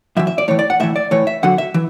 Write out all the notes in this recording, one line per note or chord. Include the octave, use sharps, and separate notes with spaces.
F#2 E3 E5
E5
D5
A2 E3 C#5
D5
F#5
A2 E3 E5
D5
A2 E3 C#5
E5
F#2 D3 F#3 F#5
E5
E3